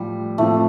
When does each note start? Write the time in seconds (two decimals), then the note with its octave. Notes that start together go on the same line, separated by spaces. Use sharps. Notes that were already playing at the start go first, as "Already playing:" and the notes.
Already playing: A2 F3 G3
0.38 A2 F3 A3 C4